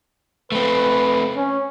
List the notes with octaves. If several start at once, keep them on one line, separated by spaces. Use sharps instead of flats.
A3 C4 B4
C#4